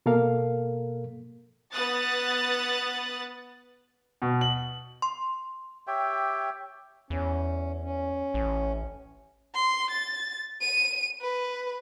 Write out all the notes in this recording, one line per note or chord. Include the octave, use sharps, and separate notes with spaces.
B2 A#3 A4 A#4 F5
B3 D#6 F#6 A6
B2
F#7
C6
G4 C#5 E5 G5
E2 C#4
C#4
A1
C6
A6
D#7
B4